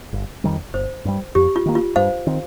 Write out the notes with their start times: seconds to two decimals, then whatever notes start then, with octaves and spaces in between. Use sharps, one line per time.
0.13 G1
0.44 F2 D#3 G3
0.74 G1 C5
1.05 G2 G3
1.35 F2 G4
1.56 F4
1.66 D#3 A#3
1.75 F4
1.96 G2 C5 F5
2.27 D#3 C4